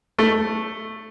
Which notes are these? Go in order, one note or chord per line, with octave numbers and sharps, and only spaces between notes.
A3